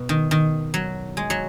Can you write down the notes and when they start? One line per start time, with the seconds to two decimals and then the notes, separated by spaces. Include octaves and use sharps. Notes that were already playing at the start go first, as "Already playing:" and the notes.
Already playing: B2
0.09 D#3
0.31 D#3
0.74 F#3
1.17 G#3
1.30 F#3